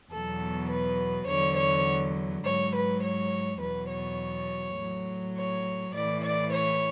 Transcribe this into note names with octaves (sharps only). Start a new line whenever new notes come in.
E2 B2 F#3 A4
B4
E2 D3 F#3 C#5
C#5
G#2 F#3 C#5
B4
C#5
E2 B2 F#3 B4
C#5
A2 F#3
C#5
A2 E3 D5
D5
C#5